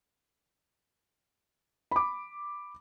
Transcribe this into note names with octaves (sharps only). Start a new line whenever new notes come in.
B5 D6